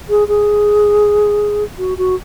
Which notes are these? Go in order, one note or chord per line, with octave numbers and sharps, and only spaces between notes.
G#4
G#4
F#4
F#4